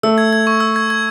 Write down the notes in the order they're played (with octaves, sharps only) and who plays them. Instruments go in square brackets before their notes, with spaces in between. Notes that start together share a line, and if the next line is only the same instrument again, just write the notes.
[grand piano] A3 [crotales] E6
[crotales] G#6
G#6
C#6
E6
G#6
G#6